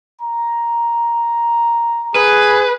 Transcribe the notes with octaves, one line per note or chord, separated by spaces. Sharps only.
A#5
G#4 B4